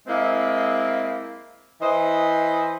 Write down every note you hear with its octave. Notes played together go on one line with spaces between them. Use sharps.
G#3 A#3 C4 E4
E3 C5 D#5